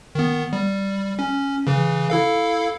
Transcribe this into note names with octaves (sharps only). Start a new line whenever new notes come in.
D#3 B3
G3
C#4
C#3 E3
E4 A4 F5